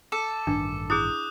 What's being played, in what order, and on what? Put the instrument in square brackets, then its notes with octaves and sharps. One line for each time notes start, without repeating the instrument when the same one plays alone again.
[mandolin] A4 [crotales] D6
[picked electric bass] A1 G2 D#3 [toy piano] D4
[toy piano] E4 G#4 [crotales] D#6 F#6 G6